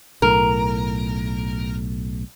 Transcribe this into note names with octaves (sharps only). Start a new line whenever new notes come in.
B1 A2 A#4